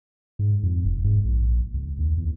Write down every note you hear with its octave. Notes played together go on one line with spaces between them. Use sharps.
G#2
F2
E1
G#2
A#1
C#2
D#2
E2